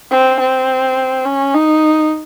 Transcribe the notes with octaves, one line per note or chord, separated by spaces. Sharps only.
C4
C4
C#4
D#4